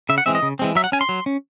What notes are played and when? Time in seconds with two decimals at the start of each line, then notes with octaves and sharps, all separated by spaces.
0.09 C#3 E5
0.18 F#5
0.26 E3 G#3 C4 E5
0.35 D#5
0.42 C#3
0.59 E3 G#3 C4
0.75 F#3 E5
0.84 F#5
0.92 C#4 G#5
1.01 C6
1.09 F#3
1.26 C#4